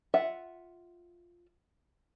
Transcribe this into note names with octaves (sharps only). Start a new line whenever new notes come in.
F4 E5 F#5